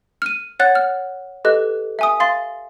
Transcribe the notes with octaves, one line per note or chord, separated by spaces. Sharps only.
F6 D#7
C#5 F#5 F#6 A6
F6
G4 A4 B4 D#5 F#6
E5 G#5 D#6
F5 C6 A6